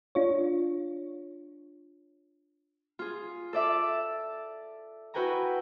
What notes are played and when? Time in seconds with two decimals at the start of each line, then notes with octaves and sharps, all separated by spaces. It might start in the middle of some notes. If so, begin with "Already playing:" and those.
0.15 D4 F4 C#5
2.99 F4 G#4
3.53 A4 D5 E5 D6
5.14 E4 F#4 B4 G5 G#5 A#5